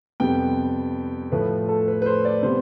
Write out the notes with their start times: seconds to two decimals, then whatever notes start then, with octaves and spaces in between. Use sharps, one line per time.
0.20 F2 C3 G3 B3 G5
1.32 A2 F3 A3 B4
1.69 A4
1.88 B4
2.02 B4
2.06 C5
2.25 D5
2.42 C3 G3 B3 C5